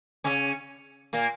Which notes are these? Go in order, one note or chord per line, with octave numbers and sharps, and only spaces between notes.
C#3 C#4
A#2 A#3